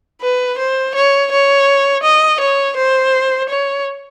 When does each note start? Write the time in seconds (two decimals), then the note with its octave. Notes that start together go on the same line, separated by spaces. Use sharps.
0.22 B4
0.59 C5
0.95 C#5
1.32 C#5
2.04 D#5
2.41 C#5
2.77 C5
3.50 C#5